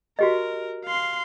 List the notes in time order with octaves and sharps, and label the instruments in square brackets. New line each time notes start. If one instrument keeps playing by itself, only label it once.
[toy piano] F#4 G4 D#5 [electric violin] A#4
[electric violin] F5 C6